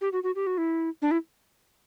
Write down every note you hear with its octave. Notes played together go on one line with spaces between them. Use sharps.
G4
F#4
F#4
G4
F#4
E4
D4
E4